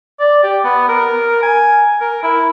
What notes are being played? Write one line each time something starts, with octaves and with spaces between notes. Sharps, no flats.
D5
G4
B3
A#4
G#5
A#4
E4